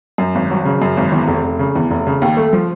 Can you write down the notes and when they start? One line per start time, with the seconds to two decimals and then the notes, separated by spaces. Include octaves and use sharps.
0.18 F#2
0.35 G#1
0.51 F#3
0.65 C#3
0.82 F#2
0.97 G#1
1.12 E2
1.28 F1
1.44 F1
1.59 C#3
1.76 E2
1.91 F1
2.07 C#3
2.22 D#2
2.37 A3
2.53 F3